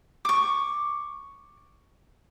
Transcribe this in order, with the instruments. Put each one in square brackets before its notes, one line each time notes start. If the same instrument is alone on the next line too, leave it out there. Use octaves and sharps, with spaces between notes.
[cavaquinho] C#6 D6